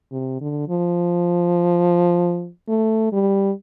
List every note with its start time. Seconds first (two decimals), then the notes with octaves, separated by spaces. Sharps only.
0.12 C3
0.41 D3
0.68 F3
2.69 A3
3.12 G3